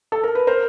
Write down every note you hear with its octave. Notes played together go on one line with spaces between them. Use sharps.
A4
A#4
B4
A#4 C5